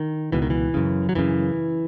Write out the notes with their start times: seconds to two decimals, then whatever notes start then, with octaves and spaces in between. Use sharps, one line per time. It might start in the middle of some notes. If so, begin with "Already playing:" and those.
Already playing: D#3
0.32 C#2 B2 E3
0.42 D#3
0.50 E3
0.74 F#2 C#3
1.09 F#3
1.15 F#2 C#3 E3